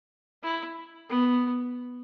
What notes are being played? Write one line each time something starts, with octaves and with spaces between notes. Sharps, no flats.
E4
B3